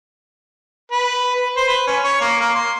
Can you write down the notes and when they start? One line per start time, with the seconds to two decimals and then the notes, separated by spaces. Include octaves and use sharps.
0.91 B4
1.35 B4
1.56 C5
1.68 B4
1.87 C#4
2.03 C#5
2.21 A#3
2.40 A#3
2.55 C6